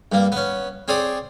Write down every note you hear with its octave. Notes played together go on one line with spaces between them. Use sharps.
G2 A#3
B3 C#4
C4 G#4 C#5 D5 D#6